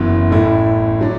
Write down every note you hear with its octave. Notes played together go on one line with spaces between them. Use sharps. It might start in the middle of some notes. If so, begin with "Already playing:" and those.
Already playing: F#1 F#2 E3 B3 E4
A1 A2 A3 E4
F#3 D4